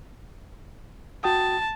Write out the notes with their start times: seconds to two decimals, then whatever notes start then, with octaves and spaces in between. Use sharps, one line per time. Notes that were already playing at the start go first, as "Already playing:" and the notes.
1.24 F#4 G5 A5 D#6